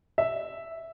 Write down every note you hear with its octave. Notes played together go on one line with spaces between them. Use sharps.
E5